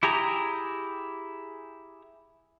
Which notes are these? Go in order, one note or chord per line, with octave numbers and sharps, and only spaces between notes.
E4 G4 G#4 A#5